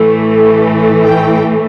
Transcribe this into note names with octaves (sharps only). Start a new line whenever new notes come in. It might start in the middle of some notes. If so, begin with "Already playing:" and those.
Already playing: A2 E3 A3
G5